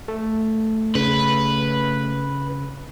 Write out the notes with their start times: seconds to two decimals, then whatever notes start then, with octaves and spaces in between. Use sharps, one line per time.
0.08 A3
0.95 C#3 B4